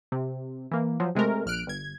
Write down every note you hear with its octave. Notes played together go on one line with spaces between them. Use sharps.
C3
E3 A#3
F3 F#3
C3 G#3 A3 A#4
A#1 F6 F#6 D7
G1 G#6